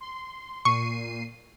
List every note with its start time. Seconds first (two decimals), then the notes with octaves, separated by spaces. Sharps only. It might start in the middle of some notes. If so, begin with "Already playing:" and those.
0.01 C6
0.65 A#2 C#6 C7 D#7